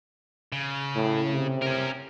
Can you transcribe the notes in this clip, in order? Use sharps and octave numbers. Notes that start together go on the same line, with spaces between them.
C#3
A2
C3
C#4 A#4